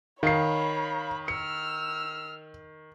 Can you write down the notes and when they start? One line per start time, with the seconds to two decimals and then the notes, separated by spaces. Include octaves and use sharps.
0.23 D#3 C#5 F5 B5 C7
1.28 E6 F6 C#7